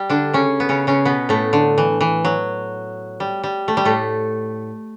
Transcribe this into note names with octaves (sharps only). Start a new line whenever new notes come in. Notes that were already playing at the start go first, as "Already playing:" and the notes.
Already playing: G3
D3 D4
C#3 C#4
B3
C#3 C#4
C#3 C#4
B2 B3
A2 A3
D3
E3
E3
F#3
G3
G3
A3
G3
A2 A3